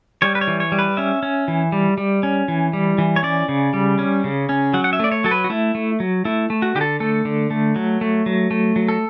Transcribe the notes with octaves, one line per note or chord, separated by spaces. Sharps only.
G3 C#5
B4
C#5
E3
C#5
G3
B4
C#4 E5
C#4
E3
G3
G3
C#4
E3
G3
E3
C#5
C#4 D5
C#3
G3
C#4
C#3
C#4
F#3 F#5
F#5
E5
A3 D5
C#5
F#3 A4
B4
F#4
A3 E4
A3
F#3
A3 E4
A3
F#4
D3 G4
A4
A3 A4
D3
A3
F#3
A3
F#3
A3
F#3
A4